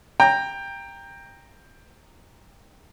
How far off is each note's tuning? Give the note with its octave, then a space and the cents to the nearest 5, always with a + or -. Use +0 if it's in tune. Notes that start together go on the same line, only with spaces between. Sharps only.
G5 +15 A#5 -5